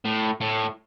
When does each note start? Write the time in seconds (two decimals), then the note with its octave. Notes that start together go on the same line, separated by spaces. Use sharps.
0.05 A2
0.41 A2